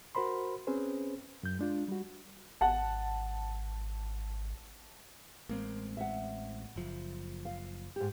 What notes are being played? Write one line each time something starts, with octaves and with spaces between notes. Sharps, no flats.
F#4 A#4 C5 B5 C6
C4 C#4 G#4 B4 C5
F#2 G6
G#3 D4 F4
G3 F#4
G#1 F#5 A5
A1 G#3 A#3 C4
E5 F#5
F#1 F3
F5
G#2 G4